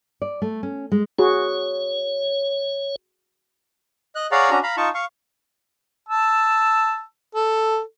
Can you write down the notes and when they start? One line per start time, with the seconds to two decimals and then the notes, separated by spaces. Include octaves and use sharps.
0.22 D5
0.42 A3
0.63 C#4
0.92 G#3
1.19 F#4 G#4 C#5
4.15 D#5 F#6
4.32 G#4 C#5 D5 F5 F#5 A#5
4.50 C#4 D4 F#4 A#5
4.63 F5 A#5 B5
4.77 D#4 F4 A5 C#6
4.94 F5 C#6
6.09 A5 E6
7.35 A4